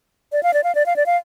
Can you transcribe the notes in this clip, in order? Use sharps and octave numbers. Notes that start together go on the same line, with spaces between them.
D5
F5
D5
F5
D5
F5
D5
F5